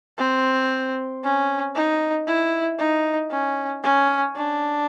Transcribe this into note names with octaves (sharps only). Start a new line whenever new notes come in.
C4
C#4
D#4
E4
D#4
C#4
C#4
D4